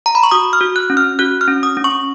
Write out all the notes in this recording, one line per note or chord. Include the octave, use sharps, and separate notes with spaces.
A#5
B5
C#6
F#4 D#6
F6
F#4
F#6
C#4
F6
F#4 F#6
F6
C#4
D#6
C#4
C#6